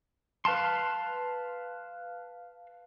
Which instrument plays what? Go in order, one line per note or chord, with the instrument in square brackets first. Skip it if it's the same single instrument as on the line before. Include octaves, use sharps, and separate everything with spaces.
[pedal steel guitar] B4 F5 A5 C6